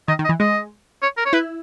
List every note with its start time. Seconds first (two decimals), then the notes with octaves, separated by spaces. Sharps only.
0.08 D#3 D#5
0.19 D#3
0.25 D#5
0.29 E3
0.40 G#3 D#5
1.02 C#5
1.17 A#4
1.26 C#5
1.33 E4 B4